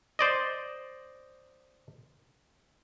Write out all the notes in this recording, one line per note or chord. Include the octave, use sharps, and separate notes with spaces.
C5 D5 D#5